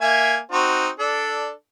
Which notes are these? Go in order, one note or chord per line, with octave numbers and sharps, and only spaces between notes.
A#3 E5 G#5
C4 D#4 F#4
D4 A4 D5